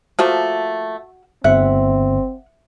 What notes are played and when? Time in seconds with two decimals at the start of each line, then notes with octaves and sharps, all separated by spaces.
0.19 F3 A3 A#3 F#4
1.44 G1 C4 E5 F#5